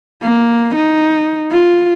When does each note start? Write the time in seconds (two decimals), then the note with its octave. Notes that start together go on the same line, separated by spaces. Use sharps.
0.22 A#3
0.75 D#4
1.52 F4